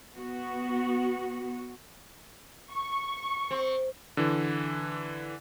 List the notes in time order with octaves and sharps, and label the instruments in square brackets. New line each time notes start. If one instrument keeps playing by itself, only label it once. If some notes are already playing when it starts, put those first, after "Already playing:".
[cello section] B3 F#4
[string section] C#6
[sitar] C4
[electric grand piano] D3 E3